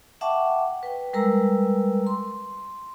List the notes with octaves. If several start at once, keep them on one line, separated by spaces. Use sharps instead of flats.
E5 F#5 G5 A5 C#6 D6
B4 G5
G3 G#3 A#4 B4 A#5 E6
C6